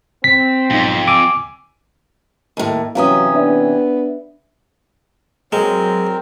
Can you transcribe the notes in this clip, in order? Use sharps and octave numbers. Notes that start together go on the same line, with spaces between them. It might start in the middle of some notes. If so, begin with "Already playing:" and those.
C4 B6
B1 F2 G#2
G#5 D6 E6 D#7
D#2 A2
C3 E3 F#3 C#4 F5 A#5 D#6
B3 D4 D5 E5
F#3 G#3 C4 A#4